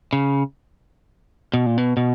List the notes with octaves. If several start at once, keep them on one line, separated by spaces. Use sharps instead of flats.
C#3
B2
A#2
B2
B2